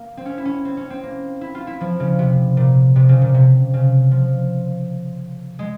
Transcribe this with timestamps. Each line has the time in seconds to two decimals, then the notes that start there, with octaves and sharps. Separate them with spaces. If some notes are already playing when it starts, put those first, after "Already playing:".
Already playing: A#3
0.17 C4
0.26 C#4
0.38 E4
0.45 C#4
0.65 C4
0.77 C#4
0.90 C4
1.03 A#3
1.41 E4
1.55 F4
1.67 E4
1.81 F3
2.00 C#3
2.19 C3
2.57 A#2
2.96 C3
3.09 C#3
3.22 A#2
3.34 C3
3.74 C#3
4.11 F3
5.59 G#3